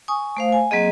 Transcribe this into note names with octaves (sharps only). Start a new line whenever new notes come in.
G#5 C#6 D#6
A3 C5 F5
G#5
F#3 A#3 C4 G#4 D#5